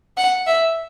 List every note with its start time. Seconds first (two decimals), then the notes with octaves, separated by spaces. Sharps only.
0.17 F#5
0.47 E5